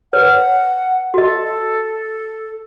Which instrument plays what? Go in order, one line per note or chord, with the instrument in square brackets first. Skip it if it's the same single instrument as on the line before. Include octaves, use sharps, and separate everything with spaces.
[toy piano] B4 C#5 [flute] F#5
[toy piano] F#4 D#5 [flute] A4